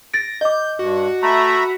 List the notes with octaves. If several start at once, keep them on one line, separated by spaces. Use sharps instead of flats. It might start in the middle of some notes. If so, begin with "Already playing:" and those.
A6 A#6 D7
D#5 D6 G6
G2 F#4
A3 E5 A#5 B5